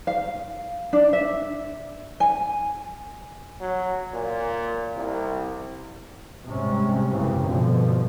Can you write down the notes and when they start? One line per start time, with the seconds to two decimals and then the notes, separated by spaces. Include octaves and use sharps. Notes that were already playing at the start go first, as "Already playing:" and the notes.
0.07 F5
0.93 D4
1.13 E5
2.20 G#5
3.60 F#3
4.14 A#2
4.96 C2
6.44 G#2 C3 G3 G#3 C#4
7.12 F#2 C#3 E3 A#3 C4
7.44 G2 B2 D3 F3